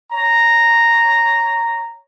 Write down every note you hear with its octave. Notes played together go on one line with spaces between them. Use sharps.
C#5 A#5